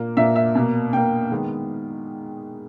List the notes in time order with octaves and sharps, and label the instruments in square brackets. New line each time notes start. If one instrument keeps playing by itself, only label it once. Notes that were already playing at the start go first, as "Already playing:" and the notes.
Already playing: [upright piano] A#2 A#3
A#2 A#3 E5
E5
B2 A#3
B2 A#3 G5
D#3 G#3 B3